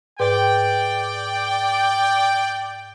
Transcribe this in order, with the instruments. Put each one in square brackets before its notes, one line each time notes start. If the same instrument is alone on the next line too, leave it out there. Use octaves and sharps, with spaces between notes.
[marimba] G#2 B4 [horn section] D5 G5